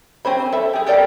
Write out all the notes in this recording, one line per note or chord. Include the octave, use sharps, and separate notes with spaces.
C4 C#4 C5 B5
A4 E5
G4 G#4
G4 A4 A#4 D5 G5